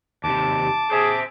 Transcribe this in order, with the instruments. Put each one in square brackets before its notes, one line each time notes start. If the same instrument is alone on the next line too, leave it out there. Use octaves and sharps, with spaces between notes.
[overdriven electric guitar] D#2 C3 [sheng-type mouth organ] A5 D6
[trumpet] G#4 [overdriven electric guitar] C5 E5